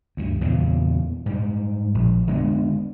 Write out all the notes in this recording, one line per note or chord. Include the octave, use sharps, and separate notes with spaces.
D2 G2
E2 A#2 C#3
G#2 G3
A#1
D3 G#3 B3